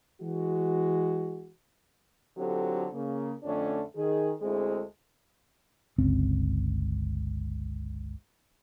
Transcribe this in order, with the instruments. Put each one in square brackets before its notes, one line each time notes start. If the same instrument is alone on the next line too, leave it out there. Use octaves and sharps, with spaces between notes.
[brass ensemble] E3 G#3 F#4
[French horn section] D3 F#3 C4 F4 G4 A4
C#3 A#3
F2 D3 A3 C#4 D4 C#5
D#3 G#4
D2 G#3 C4 E4 G#4 A4
[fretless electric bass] G1 C#2 C4 C#4